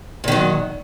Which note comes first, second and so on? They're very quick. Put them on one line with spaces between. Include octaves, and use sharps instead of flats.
A#2 D#3 F#3